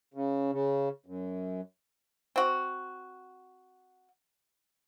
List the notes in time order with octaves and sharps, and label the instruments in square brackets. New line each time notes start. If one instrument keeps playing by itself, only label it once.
[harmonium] C#3
C#3
F#2
[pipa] C4 F#4